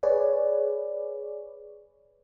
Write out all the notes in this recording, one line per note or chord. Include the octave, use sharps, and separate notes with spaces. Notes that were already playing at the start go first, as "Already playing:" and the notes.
G#4 B4 C#5 D5